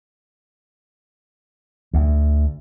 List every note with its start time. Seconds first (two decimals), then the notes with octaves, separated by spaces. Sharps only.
1.94 D2